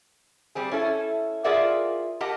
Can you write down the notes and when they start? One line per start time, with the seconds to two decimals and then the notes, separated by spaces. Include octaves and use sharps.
0.55 G3 C4 G#4
0.71 C#4 E4 A4
1.44 F4 G#4 A#4 D5 E5 F#5
2.21 G4 A#4 D#5 F#5 A5